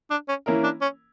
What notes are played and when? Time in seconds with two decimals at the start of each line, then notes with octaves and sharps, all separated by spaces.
0.11 D4
0.29 C#4
0.46 E3 A#3 C#4 E4 A#4
0.64 D4
0.82 C#4